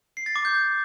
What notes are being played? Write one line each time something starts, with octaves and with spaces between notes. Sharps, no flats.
C7
A6
D6
G6